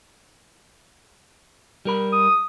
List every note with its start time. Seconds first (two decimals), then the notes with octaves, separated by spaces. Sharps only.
1.85 G3 A#4 B5
2.12 D#6